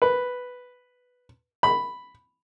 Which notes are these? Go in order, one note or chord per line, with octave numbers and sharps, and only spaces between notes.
B4
B5